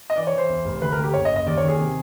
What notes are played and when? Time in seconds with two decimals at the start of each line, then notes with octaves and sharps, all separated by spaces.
0.10 D#5
0.16 E3 D5
0.27 C#5
0.33 E3 C5
0.49 E2
0.65 F1
0.82 D2 B4
0.92 A#4
0.97 D2
1.03 G4
1.14 F#1 C#5
1.25 D#5
1.31 F#1
1.36 D#5
1.46 D#2 D5
1.57 C#5
1.63 D#3
1.68 G#4
1.80 C3